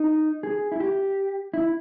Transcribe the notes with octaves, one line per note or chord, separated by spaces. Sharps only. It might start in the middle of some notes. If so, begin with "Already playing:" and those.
Already playing: D#4
G#4
E4
G4
E4